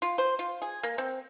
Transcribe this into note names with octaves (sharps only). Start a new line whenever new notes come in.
F4
C5
F4
G#4
A#3
C4